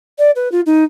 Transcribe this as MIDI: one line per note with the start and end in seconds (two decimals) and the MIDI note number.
0.18 0.31 74
0.35 0.51 71
0.51 0.60 65
0.66 0.84 63